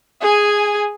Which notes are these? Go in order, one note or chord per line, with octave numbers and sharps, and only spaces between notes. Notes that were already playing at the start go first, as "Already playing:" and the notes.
G#4 G#5